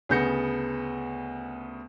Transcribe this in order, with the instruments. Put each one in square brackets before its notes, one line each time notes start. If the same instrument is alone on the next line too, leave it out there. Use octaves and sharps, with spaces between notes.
[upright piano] D2 C#3 B3 G6 A#6 C#7